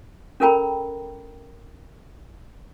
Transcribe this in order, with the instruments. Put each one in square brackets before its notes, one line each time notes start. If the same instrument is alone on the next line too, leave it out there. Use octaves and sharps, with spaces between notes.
[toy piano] C#4 A4 A#4 G5 A#5 B5